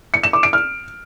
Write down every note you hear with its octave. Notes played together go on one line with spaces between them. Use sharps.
C#7
E7
D6
D7
F6